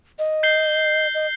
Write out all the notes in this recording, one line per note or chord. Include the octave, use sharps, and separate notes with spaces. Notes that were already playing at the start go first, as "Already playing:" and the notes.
D#5
G6 C7 G7
D#5